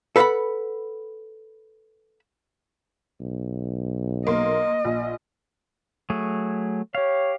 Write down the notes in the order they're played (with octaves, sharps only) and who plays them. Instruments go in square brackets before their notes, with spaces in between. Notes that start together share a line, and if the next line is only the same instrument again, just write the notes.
[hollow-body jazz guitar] A4 B4 C5 F5 F#5 B5
[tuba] B1
[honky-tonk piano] A#3 C6 [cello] D#5
[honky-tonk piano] A#1
[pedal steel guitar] F#3 A3 G#4
[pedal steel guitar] G4 F5 [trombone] C#5